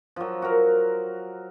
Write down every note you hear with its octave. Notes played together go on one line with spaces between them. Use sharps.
F3 F#3
F#4 A#4